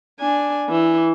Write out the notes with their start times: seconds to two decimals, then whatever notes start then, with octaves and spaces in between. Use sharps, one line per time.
0.20 D4 G#5
0.69 E3